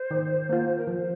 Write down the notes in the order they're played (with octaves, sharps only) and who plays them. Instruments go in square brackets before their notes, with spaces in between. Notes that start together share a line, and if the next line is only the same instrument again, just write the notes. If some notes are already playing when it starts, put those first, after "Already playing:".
Already playing: [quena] C5
[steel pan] D#3
A#3 F4
[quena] A#4
[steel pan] F3 [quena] C5